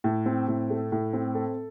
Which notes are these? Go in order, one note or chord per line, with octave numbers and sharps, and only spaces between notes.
A2
C4
A2
A3
A2
C4
A4